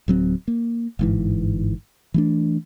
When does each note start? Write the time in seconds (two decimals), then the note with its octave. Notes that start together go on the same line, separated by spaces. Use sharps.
0.08 D1 F#3 C4
0.48 A#3
0.99 G1 G#2 E3
2.14 E3 A3 D4